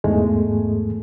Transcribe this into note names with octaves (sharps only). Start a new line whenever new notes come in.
E2 G#2 G#3 A3